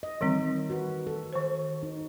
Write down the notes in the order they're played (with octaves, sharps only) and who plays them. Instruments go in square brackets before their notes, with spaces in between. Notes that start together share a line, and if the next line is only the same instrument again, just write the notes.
[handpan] D#5
[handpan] D#3 A#4 [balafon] E3 G3 C4
[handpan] F#4 B4
A4
[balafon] D#3 C5
[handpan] D#4